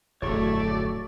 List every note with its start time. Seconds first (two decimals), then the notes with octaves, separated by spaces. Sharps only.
0.22 D1 F2 F#3 A3 C#5 D5 C#6